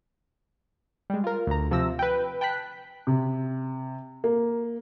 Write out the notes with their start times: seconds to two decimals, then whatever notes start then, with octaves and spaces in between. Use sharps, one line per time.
1.10 G3 G#3
1.24 F4 A#4
1.47 D2 A#5
1.71 C3 F3 E6 A#6
1.99 B4 G5
2.41 G5 A5 B5 F#6 B6
3.07 C3
4.24 A#3